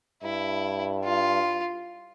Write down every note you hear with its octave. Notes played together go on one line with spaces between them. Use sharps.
G2 E4
F4